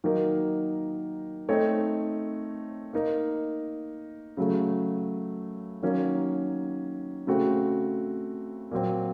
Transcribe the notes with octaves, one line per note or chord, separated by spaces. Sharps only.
D#3 F#3 A#3 D#4 A#4
A3 C4 D#4 A4 C#5
A#3 D#4 A#4
C#3 F#3 A3
D#3 F#3 A#3 C#4
C#3 A3 C4 F#4
A#2 F#3 C4